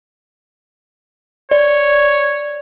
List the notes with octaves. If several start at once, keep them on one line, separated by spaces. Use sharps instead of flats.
C#5 D5